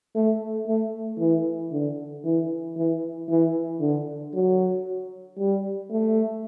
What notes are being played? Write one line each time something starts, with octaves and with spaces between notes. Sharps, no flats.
A3
A3
E3
D3
E3
E3
E3
D3
F#3
G3
A3